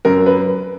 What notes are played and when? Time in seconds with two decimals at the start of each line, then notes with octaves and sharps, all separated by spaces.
0.05 F#2 A#4
0.26 B4